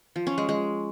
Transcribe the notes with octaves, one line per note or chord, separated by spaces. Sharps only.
F3
C#4
G#3
G#3